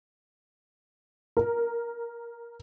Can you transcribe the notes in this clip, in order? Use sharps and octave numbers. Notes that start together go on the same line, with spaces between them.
A#4